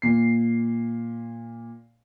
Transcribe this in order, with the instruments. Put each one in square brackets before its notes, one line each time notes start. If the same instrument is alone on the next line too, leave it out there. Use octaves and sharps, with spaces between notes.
[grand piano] A#2 C7